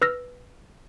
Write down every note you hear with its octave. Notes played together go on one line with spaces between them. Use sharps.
B4 E6 F6 A#6